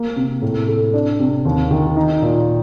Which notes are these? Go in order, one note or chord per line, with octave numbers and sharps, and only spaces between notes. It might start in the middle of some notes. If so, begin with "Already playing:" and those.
Already playing: A#3
C3
A2
A3
D4
C3
D#2
D#3
D#4
A#2